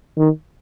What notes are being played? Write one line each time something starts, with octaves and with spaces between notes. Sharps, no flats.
D#3